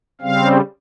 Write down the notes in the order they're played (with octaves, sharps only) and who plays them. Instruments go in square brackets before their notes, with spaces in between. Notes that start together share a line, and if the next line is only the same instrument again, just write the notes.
[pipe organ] C#3 G3 C4 F5